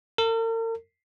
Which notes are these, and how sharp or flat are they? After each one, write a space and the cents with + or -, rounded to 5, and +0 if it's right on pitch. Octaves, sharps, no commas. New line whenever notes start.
A#4 -45